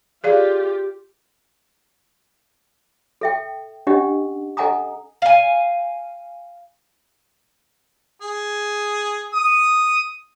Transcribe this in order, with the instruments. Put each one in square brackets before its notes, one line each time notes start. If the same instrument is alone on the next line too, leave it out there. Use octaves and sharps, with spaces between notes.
[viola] F4 G4 [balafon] G#4 D5 F5
[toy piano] A4 E5 G5
C#4 D4 G4 D#5 F#5
A4 D#5 F#5 G#5 A#5 D#6
[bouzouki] F5 G#5
[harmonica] G#4
D#6